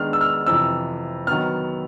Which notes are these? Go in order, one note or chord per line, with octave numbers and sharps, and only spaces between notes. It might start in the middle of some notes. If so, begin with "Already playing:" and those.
Already playing: D#3 G#3 B3 D4 F6
E6
F6
F2 C3 E3 E6
D#3 F#3 B3 F6